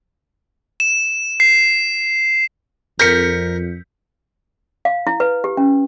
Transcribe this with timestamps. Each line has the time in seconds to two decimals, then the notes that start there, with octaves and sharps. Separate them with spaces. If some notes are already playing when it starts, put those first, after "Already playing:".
0.80 E7
1.40 C7
3.00 F2 A#4 G6 B6 C#7
4.85 F5
5.07 E4
5.20 B4
5.44 G4
5.57 C#4